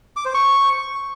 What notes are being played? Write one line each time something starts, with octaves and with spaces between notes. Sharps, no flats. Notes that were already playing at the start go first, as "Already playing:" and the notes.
D6
C5
C#6